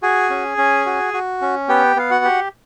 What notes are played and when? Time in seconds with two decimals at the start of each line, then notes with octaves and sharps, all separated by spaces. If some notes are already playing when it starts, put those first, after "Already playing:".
0.03 F#4 G#4 G#5
0.30 C#4
0.58 C#4
0.86 F#4
1.14 F#4
1.41 C#4
1.68 B3 G4 G5
1.96 B3 F5
2.10 F#4 F#5
2.24 G4